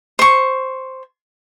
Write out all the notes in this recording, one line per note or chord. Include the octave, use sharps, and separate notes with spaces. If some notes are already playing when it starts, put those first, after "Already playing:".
C5 C#6